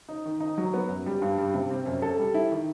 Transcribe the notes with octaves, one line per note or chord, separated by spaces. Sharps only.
D#4
D#3
D#4
F#3
B3
F#2
G3
G2
G3
C3
C4
F#2
A4
G3
E4
D#3